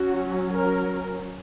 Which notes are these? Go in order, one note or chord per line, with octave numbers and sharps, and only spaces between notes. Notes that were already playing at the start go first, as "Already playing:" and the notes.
Already playing: F#3 C#4 F#4
A#4